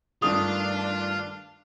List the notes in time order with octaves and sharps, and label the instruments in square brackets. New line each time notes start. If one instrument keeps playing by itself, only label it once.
[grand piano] G2 D#3 A3 [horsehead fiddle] D4 [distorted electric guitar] F4 [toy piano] D#6